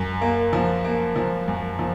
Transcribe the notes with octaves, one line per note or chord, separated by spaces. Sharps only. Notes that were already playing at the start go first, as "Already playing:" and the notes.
Already playing: F#2
A#3
F3
A#3
F3
F#2
F3